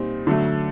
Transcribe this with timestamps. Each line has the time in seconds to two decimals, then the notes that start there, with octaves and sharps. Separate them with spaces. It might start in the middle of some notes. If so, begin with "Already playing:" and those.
Already playing: A#2 G3 C4 D#4
0.27 D3 F#3 A3